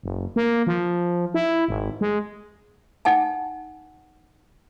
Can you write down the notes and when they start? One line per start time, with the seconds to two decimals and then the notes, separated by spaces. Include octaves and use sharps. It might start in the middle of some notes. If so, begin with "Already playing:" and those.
0.03 F#1
0.36 A#3
0.67 F3
1.34 E4
1.68 G#1
2.01 G#3
3.05 D#4 F#5 G#5 A5